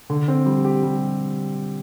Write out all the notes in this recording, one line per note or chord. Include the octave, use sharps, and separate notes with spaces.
D3
C4
G3
G4
G3